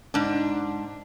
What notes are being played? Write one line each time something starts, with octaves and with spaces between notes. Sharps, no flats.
G#2 D4